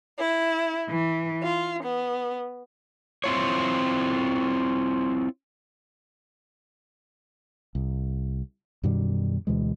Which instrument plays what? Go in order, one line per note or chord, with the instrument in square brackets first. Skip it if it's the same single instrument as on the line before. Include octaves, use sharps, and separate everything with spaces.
[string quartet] E4
E3
F4
B3
[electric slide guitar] C4 E4 F4 C#5
[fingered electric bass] C2
F#2 B2 D#3 G3
D2 B2 E3 G#3